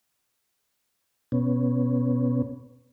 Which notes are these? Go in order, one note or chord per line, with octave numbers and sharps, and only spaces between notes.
B2 B3 C#4